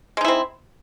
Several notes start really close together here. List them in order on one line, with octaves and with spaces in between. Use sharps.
G#3 D#4 E4 C4